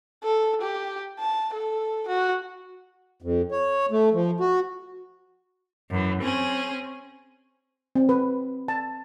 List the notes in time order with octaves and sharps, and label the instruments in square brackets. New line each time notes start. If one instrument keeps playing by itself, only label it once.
[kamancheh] A4
G4
A5
A4
F#4
[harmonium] F2
C#5
A3
F3
F#4
[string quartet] F#2 E3
C4 C#4 G#4
[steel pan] C4
B4
A5